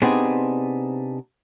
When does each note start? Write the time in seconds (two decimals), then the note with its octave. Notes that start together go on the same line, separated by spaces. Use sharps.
0.02 C3 B3 C4 D4 D#4 G#4